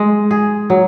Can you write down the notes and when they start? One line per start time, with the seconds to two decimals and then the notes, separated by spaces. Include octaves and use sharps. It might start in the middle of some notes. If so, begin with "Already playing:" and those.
Already playing: G#3
0.31 G#4
0.70 F#3